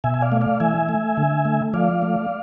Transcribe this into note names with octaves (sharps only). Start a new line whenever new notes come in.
B2 E5 G#5
G#5
D5 F5
A3
D5 F5
E3 E5 G#5
A3
D3
A3
F3 D5 F5
A3